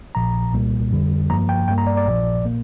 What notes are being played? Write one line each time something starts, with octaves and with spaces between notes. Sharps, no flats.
A#1 A#2 F3 A#5
C2 A#2 G3 A#3
F2 D3 G3
G2 F3 A#3 A#5
G5
G2 G3 A#3 G5
A#5
D5
D5
A#1 A#2 F3
A#2 A#3